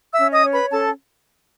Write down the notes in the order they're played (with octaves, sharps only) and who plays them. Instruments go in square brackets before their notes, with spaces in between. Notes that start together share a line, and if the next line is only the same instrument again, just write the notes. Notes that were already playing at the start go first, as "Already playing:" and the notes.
[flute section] E5 E6
C#4
D#5 D#6
C#5
B4 B5
C#4 A4 A5